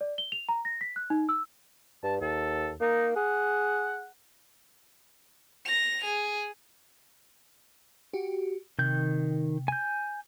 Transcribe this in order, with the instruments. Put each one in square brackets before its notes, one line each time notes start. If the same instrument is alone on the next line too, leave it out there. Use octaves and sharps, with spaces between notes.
[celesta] D5
G7
F7
A#5
A#6
B6
F#6
D#4
E6
[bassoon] G2 [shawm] A5
[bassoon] D#2 [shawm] A4
[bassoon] A#3 [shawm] D#4
[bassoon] G#4 [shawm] F#5
[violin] A#6 F7
G#4
[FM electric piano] F#4 G4
[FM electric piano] C3 [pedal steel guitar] D#3 G6
[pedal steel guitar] G#5 G6